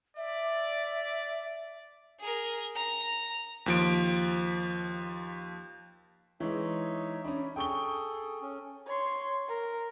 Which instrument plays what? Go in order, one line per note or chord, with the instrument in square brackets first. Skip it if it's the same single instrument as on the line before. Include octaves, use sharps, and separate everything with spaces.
[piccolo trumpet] D5 [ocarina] E5
[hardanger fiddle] G#4 A#4
A#5
[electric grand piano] D#2 F3 D7
[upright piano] E3 G#3 [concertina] D#4 C#5 E5
[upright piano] C#4 D4 [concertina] B5
[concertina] G#4 A4 [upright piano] G5 C#6 G7
[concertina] C#4
[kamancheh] C#5 C6
A#4